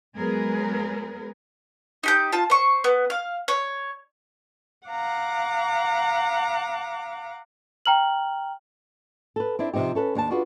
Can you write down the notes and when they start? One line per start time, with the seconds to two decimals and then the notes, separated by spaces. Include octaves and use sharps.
0.16 F#3 G#3 B3 G#4 A#4 B4
2.03 D#4 G4 G6
2.32 F4 A5
2.50 C5 C#6
2.84 B3
3.10 F5
3.48 C#5
4.88 F5 F#5 A#5 D6
7.86 G5 A#5 F6 F#7
9.36 A4 B4
9.59 C4 D4 E4
9.73 C3 F3 C4 D#4 G4
9.95 C#4 A4 B4
10.15 D#2 D4 G5 A5
10.30 D4 F4 F#4 G#4 B4